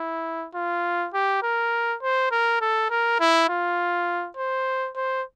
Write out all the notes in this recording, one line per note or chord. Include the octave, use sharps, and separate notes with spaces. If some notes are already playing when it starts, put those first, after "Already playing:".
Already playing: E4
F4
G4
A#4
C5
A#4
A4
A#4
E4
F4
C5
C5